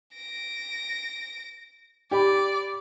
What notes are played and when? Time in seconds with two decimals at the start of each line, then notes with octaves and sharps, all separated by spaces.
0.15 A#6 D7
2.11 G4 D5 B5